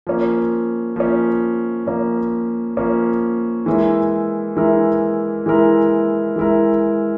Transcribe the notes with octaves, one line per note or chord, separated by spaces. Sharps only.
F3 A#3 C#4
F3 A#3 C#4
F3 A#3 C#4
F3 A#3 C#4
E3 G#3 E4 A#4
E3 G#3 E4 A#4
E3 G#3 E4 A#4
E3 G#3 E4 A#4